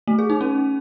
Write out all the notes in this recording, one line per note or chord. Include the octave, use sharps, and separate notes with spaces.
A3
G#4
D#4
C#4